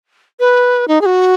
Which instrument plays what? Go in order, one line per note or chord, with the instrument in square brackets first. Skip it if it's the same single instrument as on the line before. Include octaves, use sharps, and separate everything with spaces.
[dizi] B4
D#4
G#4
F#4